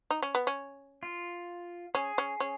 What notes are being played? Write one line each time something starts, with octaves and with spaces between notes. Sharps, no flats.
D#4
C#4
B3
C#4
F4
C#4 G#4
C#4
C#4